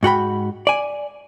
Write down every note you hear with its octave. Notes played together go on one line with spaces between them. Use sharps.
G#2 F#4 G5 B5
D5 G#5